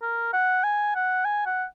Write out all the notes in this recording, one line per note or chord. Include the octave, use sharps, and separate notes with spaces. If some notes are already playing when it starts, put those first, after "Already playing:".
A#4
F#5
G#5
F#5
G#5
F#5